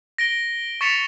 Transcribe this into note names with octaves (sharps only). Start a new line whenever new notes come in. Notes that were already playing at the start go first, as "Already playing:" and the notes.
A#6 D7 G7
C#6 A6 B6 C#7 E7 F7